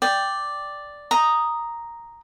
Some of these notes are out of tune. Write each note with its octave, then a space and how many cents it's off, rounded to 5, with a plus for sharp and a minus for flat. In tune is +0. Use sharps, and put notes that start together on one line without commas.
D5 +0 G5 +0
A#5 +0 D#6 +0